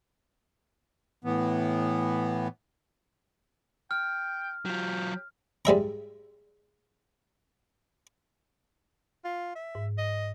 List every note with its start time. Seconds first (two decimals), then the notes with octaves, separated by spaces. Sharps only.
1.24 A2 E3 B3
3.91 G5 F6
4.65 F#3 F4 G4
5.65 G#2 G3 E5 A#5
9.25 F4
9.55 E5
9.75 G#2
9.98 D#5